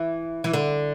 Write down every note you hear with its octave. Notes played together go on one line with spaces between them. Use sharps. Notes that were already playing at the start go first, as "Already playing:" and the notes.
Already playing: E3
E3
D3